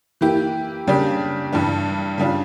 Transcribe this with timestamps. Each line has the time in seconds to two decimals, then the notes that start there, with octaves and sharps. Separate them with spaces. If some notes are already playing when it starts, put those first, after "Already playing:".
0.21 E3 A#3 E4 G4
0.87 C#3 G3 A#3 D4 G4
1.53 G2 E3 G3 D4
2.18 C#3 G3 D4 F4